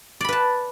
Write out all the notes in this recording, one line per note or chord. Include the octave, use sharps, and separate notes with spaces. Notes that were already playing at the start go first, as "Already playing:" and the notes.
B4 D5 A5 B5